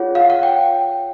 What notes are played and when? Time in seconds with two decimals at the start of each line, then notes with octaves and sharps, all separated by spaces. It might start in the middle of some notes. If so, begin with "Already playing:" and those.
Already playing: F4 G#4 C#5 F#5
0.15 F5
0.30 F#5
0.43 G5